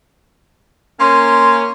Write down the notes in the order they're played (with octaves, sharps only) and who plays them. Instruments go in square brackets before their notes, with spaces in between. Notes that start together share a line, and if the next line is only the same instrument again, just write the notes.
[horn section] A#3 C#4 [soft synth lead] C6